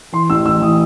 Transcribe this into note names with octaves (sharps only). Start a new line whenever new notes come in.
E3 C6
A1 E6
A1 E6
E3 D#6